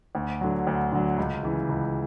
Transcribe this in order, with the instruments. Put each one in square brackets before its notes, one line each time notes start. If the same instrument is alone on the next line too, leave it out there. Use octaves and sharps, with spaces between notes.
[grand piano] D2
D3 F#3
D2
D3 F#3
C#2
C#3 E3
C#2